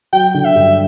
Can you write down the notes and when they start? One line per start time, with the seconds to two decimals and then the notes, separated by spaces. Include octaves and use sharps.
0.13 F#3 G5
0.34 D3
0.45 E5
0.55 G2